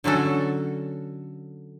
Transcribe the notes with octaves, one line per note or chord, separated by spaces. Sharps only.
D3 F#3 C#4 F#4 A4